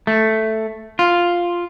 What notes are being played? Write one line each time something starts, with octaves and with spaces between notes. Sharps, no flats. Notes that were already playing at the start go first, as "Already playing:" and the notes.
A3
F4